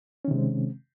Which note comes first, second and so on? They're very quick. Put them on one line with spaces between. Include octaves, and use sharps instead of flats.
C#4 D#3 C3 G#3 C4